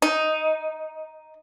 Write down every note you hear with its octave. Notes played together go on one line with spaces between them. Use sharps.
D#4